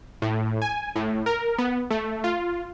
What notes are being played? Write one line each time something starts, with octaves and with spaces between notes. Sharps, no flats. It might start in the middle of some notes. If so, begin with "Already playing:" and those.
A2
G#5
A2
A#4
B3
A3
F4